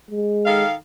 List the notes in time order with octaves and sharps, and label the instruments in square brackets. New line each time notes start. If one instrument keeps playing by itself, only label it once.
[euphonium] G#3
[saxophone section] D#3 A4 F5